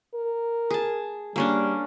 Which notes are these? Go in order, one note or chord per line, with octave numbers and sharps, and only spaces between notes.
A#4
G#4 A5
G3 A#3 C#4 D4